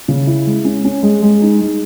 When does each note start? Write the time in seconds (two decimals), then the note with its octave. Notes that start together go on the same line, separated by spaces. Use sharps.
0.08 C#3
0.27 E4
0.46 G#3
0.65 C#4
0.85 C#4
1.03 G#3
1.22 G#3
1.42 D#4
1.61 G#3